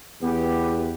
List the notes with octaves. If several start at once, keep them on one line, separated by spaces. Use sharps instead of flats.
E2 B3 G4 B4